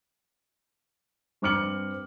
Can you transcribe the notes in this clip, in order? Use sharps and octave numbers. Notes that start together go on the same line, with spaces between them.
G2 C4 D6 F6 C#7 F#7